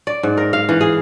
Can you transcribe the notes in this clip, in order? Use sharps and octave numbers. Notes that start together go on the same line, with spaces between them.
D5
G#2
A#4
F5
E3
G#4